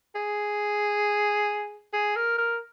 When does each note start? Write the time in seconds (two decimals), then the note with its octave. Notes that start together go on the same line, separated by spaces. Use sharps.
0.15 G#4
1.93 G#4
2.16 A#4
2.38 A#4